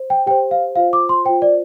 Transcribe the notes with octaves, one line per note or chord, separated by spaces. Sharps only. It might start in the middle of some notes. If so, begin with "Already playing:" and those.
Already playing: C5
G5
G4 C5 G5
F5
F4 C5 F5
D6
C6
F4 C5 G5
D5